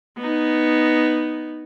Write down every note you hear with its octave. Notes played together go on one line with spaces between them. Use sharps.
B3 D#4